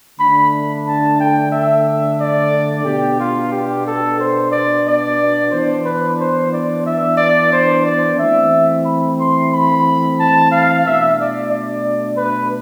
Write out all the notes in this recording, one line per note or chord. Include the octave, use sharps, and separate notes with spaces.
D3 A3 D4 B5
A5
G5
E5
D5
B2 B3 D4 G4
F4
G4
A4
C5
D5
D5
E3 B3 D4 C5
B4
C5
D5
E5
D5
C5
D5
E3 A3 C4 E5
B5
C6
B5
A5
F5
B2 A3 D4 E5
D5
D5
B4